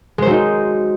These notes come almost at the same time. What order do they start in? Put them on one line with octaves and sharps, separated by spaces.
G#3 C5 F#3 D#4